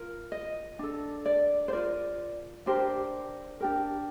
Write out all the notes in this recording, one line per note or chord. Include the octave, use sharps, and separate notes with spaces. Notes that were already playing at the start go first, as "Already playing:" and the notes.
Already playing: F4 A#4
D#5
D4 A4
D5
C5
F4 A#4 D5
D4 G4 A#4 C5
D4 G4 A#4